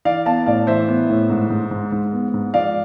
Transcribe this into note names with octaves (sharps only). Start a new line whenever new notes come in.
E3 D5 F5
B3 F5 A5
A2 D5 F5
E3 C5 E5
B3
A2
G#2
G#2
G#2
G#2
B3
G#2
F3 D5 F5